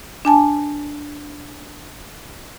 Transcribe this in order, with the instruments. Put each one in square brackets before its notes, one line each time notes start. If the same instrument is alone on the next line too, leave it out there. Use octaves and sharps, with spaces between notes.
[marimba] D4 G#5 A5